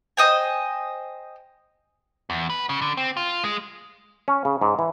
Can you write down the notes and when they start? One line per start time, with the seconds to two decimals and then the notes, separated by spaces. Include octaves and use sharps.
0.17 C5 D#5 G5 G#5
2.30 E2
2.50 B4
2.69 C#3
2.82 D3
2.97 C4
3.17 F4
3.44 G#3
4.28 C#4
4.45 C#3
4.61 G#2
4.79 E3